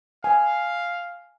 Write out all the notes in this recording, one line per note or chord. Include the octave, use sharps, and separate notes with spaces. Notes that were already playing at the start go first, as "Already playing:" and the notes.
F5 G#5